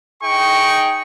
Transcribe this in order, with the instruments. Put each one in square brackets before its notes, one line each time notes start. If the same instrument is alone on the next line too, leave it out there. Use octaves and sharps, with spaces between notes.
[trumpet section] D#4 G#4 G5 C#6